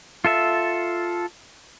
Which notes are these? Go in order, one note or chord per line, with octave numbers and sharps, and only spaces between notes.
F4 A4 E5